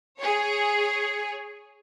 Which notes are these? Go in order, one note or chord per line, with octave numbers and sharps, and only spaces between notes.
G#4 C#5